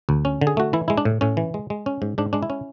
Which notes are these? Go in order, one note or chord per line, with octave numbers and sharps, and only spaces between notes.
D2
C#4
D3
G#4
A3 F#4
E3 E4
G#3 E4
D4
A2
A2 C#4
E3
G#3
G#3
C#4
G#2
G#2 D4
G#3 D4
E4
C#4